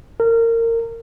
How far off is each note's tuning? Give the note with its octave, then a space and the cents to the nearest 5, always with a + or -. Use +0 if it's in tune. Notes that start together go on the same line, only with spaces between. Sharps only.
A#4 -25